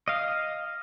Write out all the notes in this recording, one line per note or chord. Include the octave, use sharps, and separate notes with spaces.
D#5 F5